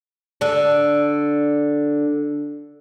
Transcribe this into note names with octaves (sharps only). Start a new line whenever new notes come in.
D3 D4